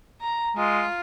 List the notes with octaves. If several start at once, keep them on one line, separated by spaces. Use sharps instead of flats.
A#5
G#3 F4